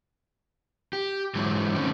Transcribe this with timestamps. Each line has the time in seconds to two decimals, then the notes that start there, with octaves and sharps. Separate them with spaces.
0.93 G4
1.35 G#2 D3 E3 F#3 G#3
1.75 D3 D#3 A3 C4 C#4